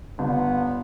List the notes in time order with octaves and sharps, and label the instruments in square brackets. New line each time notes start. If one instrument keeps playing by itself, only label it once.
[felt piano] G1 G2 [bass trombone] B3